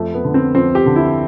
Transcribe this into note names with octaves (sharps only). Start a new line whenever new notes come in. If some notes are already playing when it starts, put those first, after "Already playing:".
Already playing: F2 A3
B3
D3
C4
F2 C4
G4
D3
E4